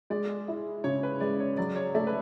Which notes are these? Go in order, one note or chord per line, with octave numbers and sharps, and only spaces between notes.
G#3 D5
E4
C#3 C#5
B4
G#3 D5
C#5
F#3 D5
C#5
A3 D5
B4